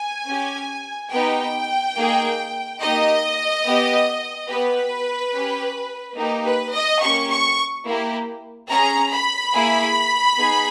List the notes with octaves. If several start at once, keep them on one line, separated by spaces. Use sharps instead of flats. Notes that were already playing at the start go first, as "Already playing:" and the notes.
Already playing: G#5
C#4 G4
B3 D#4 G4 G5
A#3 D#4 G#4
A#3 D#4 G4 D#5
B3 G4
B3 G4 B4
C#4 G4
A#3 D#4 G4
B4
D#5
A#3 C#4 G4 C#6
C#6
A#3 E4 G4
C#4 G#4 A#5
B5
A#3 E4 G#4
B3 D#4 G#4